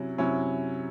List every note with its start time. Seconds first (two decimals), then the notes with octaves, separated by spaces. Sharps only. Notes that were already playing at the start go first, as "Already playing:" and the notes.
Already playing: C3 F#3 C#4 E4
0.18 C3 F#3 C#4 E4